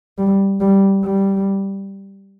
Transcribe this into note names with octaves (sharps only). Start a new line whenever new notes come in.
G3
G3
G3